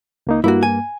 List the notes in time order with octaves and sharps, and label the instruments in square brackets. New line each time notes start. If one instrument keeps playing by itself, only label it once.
[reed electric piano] C#2 A#3 D#4
[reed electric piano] G2 A#3 [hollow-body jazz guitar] E4 F#4
[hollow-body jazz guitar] G#5